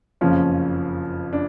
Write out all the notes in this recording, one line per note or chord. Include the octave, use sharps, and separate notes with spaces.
F#1 F2 C#3 F3 C#4
D4